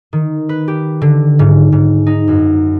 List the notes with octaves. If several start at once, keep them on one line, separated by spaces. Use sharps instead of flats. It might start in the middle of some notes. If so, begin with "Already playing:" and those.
D#3
B4
G4
D3
G#2
G#2
D#4
F#2